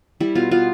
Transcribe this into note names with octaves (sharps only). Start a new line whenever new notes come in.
G3 E4
B2 F4
B3 F4